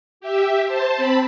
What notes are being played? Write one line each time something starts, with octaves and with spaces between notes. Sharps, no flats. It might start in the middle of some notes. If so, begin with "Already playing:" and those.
G4 E5
C5 A5
C4 A5 B5